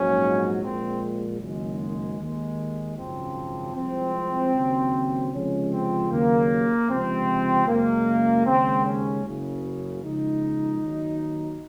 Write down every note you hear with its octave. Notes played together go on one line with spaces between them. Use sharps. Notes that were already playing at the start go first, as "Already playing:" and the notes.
Already playing: A#1 G#2 F#3 C#4
A#1 A#2 G#3 C4
F#1 F#2 D#3 G#3
D#2 D#3 G#3
G#1 F#2 C#3 F3 C4
C2 C3 F3 G#3 C4
D#2 C#3 F#3
C#2 C3 F3 G#3 C#4
C4
D#2 C#3 F#3 A#3
C#2 C3 F3 C4
F#2 C#3 G#3 A#3
D#2 C#3 G#3 C4
C#4
F#1 F#2 C#3
C#2 C#3 F3 G#3 D#4
D#2 D#3 F#3